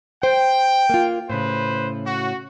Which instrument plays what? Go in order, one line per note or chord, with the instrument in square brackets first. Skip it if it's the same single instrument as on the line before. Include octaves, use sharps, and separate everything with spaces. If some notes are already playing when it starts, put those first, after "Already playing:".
[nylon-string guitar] C5 [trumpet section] G5
[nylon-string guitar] A#3 F4
[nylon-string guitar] A2 C#3 [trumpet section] B4 C5
[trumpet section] F#4